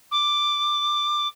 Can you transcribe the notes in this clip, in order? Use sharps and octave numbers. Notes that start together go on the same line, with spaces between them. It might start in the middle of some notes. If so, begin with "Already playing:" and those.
D6